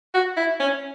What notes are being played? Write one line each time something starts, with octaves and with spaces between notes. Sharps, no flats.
F#4
E4
C#4